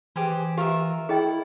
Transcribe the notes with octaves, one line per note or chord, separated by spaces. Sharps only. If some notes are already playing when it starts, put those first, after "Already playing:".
E3 G4 G#4 C5
F4 G4 A#4 E5
E4 G#4 D#5 G5